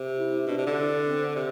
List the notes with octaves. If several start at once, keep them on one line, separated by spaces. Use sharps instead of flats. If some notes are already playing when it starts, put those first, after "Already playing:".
Already playing: C3
E4
B2 D4
C3
D3
D4
C4
C3